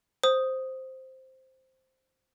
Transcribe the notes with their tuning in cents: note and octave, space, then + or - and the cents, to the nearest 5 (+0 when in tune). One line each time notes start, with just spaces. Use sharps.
C5 +0 D#6 +0